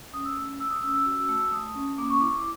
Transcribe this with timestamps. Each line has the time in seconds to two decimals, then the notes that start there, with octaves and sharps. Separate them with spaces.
0.14 C#4 D#6
0.25 E6
0.37 A3
0.60 A3 E6
0.71 D#6
0.82 C#4 E6
0.94 E6
1.06 F#4 E6
1.29 A3
1.51 A3 D#6
1.75 C#4
1.98 A#3 D6
2.10 C#6
2.20 E4 D6
2.32 D6